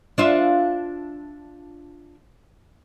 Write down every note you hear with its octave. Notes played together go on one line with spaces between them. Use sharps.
D4 F4 E5